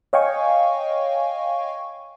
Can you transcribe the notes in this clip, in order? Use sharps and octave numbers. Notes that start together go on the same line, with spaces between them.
C#5 D#5 F5 G5 G#5 C#6